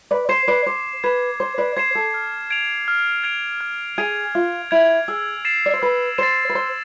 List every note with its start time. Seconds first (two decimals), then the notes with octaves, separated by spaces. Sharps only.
0.11 B4 D5
0.29 C5 G#6 C7 E7
0.48 B4 D5
0.66 C5 D6
1.04 B4 G#6 C7 E7
1.40 C5 D6
1.58 B4 D5
1.77 C5 G#6 C7 E7
1.95 A4
2.14 F6
2.50 G#6 D7 F7
2.88 F6
3.24 G#6 D7 F7
3.61 F6
3.98 G#4 G#6 D7 F7
4.35 F4 F6
4.71 E4 G#6 D7 F7
5.08 G#4 E6
5.45 A6 C7 E7
5.66 D5
5.73 C5
5.82 B4 E6
6.18 C5 A6 C7 E7
6.49 B4
6.55 C5 E6